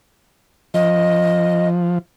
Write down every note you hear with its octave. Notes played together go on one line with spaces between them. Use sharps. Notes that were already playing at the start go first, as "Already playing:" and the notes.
F3 D#5